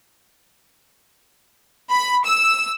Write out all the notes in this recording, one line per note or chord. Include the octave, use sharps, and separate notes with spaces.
B5
E6